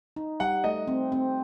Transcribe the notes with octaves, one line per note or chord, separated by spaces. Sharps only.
D#4
G3 F#5
A3 D#5
C4
C4